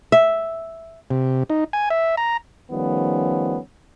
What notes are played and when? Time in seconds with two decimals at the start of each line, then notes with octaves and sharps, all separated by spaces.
0.12 E5
1.11 C3
1.50 D#4
1.73 G#5
1.90 E5
2.17 A#5
2.72 D#3 F3 G3 A3 B3 C#4